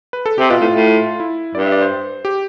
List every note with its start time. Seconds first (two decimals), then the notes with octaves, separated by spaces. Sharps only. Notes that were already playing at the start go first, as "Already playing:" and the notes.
0.13 B4
0.26 A4
0.38 C3 G4
0.50 B2 F4
0.61 A2
0.74 A2
1.20 E4
1.55 G2 D5
1.66 E5
1.72 D5
1.81 C5
2.25 G4